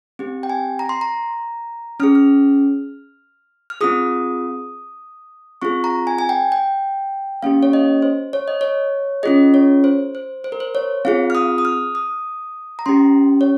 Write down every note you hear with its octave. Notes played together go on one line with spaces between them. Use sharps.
C4 G4
G5
G#5
A#5
C6
A#5
C#4 G#4 F6
F6
F6
C4 F4 G#4 D#6
C4 F4 G#4 C#6
A#5
G#5
G#5
G5
G5
A#3 C#4 G4 F5
C#5
D#5
C5
C#5
D#5
C#5
C#4 F4 G#4 D#5
C#5
C5
C5
C5
A#4
C5
C#5
C4 F4 G#4 F5
F6
D#6
D#6
F6
D#6
A#5
C#4 G4 C6
C#5